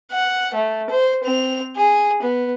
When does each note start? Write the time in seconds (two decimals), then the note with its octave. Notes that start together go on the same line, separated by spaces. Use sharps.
0.12 F#5
0.54 A3
0.90 C5
1.23 C4 F7
1.76 G#4
2.22 B3